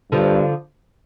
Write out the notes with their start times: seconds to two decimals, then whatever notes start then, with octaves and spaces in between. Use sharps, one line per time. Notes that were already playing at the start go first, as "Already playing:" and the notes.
0.12 G2 D3 F3